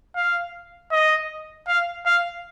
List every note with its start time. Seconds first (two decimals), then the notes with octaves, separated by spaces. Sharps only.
0.16 F5
0.92 D#5
1.68 F5
2.06 F5